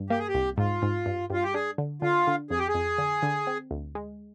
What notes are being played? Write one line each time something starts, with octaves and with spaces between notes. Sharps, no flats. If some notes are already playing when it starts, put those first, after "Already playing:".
Already playing: G2
A#3 G4
G#4
G4
C2
G#2 F4
G#2
G2
G2 F4
G4
D4 G#4
D3
D3 F4
D3
F2 G#4
G4
G#4
F2
D3
D3
C4
D2
G#3